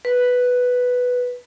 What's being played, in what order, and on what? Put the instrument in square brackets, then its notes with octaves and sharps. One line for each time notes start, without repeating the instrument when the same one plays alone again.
[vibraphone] B4